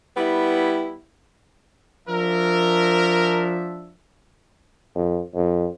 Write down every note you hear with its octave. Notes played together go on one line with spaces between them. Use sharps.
G3 B3 E4
F3 D4 A#4 E5
F2
F2